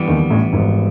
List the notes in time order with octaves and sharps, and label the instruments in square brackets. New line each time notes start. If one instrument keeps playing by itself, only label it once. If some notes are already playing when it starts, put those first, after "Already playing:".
Already playing: [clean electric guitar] G2 E3 G3 B3
[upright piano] D#2 D#3
A1 A2
G#1 G#2